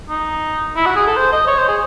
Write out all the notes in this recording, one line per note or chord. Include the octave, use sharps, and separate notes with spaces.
D#4
E4
F#4
G#4
A4
C5
D#5
C#5
C5
G#4